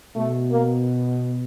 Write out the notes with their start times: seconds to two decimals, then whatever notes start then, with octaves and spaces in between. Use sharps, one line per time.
0.16 B2 A3
0.52 A#3